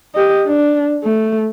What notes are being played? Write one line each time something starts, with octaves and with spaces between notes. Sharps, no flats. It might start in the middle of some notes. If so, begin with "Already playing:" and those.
G4 D#5
D4
A3